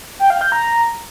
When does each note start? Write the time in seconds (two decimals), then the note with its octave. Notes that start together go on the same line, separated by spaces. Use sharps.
0.19 G5
0.30 F5
0.41 G6
0.52 A#5